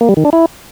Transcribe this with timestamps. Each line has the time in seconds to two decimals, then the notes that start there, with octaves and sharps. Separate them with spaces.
0.01 A#3
0.09 G3
0.17 D#3
0.25 D4
0.33 E4